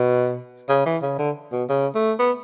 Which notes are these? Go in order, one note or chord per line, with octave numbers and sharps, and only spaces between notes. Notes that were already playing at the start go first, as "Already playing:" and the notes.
Already playing: B2
C#3
E3
C#3
D3
B2
C#3
A3
B3